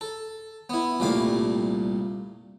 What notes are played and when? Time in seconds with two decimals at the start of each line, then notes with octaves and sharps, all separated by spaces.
0.01 A4
0.70 B3 E4
1.00 C2 A#2 G3 A3 F5 D6